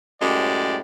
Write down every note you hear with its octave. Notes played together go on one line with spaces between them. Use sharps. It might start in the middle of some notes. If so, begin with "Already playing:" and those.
F#2 A2 G#3 G4 D5